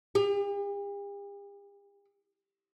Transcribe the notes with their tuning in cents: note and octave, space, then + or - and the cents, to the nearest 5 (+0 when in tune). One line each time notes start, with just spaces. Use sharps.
G4 +45